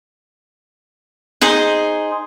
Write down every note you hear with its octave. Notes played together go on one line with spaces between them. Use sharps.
D#4 G#4 C5